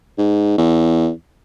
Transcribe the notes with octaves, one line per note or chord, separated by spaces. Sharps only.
G#2
E2